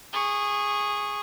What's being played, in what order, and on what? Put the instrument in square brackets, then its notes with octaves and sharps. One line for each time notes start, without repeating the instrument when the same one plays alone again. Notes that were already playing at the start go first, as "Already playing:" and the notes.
[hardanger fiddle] G#4 C#6